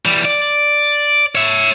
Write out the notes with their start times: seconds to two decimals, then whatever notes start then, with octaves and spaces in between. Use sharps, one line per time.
0.05 E3 G3
0.25 D5
1.35 C#5 E5